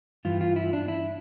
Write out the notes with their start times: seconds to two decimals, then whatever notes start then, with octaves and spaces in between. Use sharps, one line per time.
0.25 G2 E3 F4
0.41 F4
0.56 E4
0.73 D4
0.88 E4